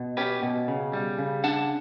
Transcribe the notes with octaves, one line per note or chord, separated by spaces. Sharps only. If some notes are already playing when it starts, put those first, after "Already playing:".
Already playing: B2
C#4 G4 B4
B2
C#3
G3
C#3
D4 F#5 A5